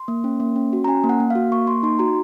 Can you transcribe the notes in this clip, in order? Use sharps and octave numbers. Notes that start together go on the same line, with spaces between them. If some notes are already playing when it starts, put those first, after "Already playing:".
Already playing: C6
A#3
C#4
A#3
C#4
F#4
A#5
C#4 G#5
A#3
F#5
A#3
F#4 F5
A#3 C#6
A#3 C6
D#4 C6
F#4 A#5